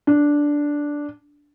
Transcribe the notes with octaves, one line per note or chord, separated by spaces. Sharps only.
D4